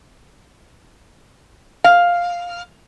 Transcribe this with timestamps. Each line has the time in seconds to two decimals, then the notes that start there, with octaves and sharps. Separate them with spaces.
1.84 F5